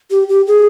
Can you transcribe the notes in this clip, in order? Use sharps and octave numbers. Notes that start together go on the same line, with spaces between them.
G4
G4
G#4